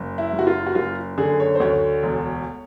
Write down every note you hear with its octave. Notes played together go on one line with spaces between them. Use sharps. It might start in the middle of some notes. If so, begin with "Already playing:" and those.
Already playing: F#1
E4
F#1
F#4
F4
F#4
F#1 F4
D3 G#4
C#5
C5
D2 C#5
E1